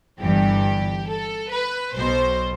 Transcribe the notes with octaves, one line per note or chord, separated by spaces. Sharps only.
G1 G2 E3 G4
A4
B4
B1 B2 C5